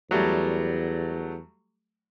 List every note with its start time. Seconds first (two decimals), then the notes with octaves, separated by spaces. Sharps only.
0.11 E2 F#3 G3 A3